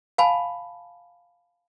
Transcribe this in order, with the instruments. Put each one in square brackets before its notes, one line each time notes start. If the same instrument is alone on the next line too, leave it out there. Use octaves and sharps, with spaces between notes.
[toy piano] F5 G#5 A5 B5